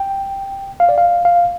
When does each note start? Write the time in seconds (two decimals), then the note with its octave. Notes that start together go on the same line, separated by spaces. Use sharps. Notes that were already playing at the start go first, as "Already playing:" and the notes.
Already playing: G5
0.80 F5
0.89 D5
0.98 F5
1.25 F5